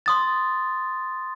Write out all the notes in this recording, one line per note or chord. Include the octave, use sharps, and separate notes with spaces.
C6 D#6 A6